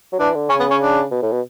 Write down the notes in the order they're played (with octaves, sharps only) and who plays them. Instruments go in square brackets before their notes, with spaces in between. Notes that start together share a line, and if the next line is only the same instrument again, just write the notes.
[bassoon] F#3
[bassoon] E3 [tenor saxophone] D4
[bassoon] D3
[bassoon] C#3 [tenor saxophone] C#4
[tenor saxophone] B3
C#4
D4
[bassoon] B2
A2
B2